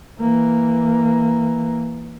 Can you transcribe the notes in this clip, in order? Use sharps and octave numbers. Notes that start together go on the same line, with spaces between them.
E3 A#3